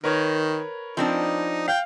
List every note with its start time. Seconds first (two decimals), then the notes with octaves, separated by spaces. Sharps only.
0.04 D#3 A#4 B4 C#5
0.97 F3 C4 D4 D#4
1.68 F5 G5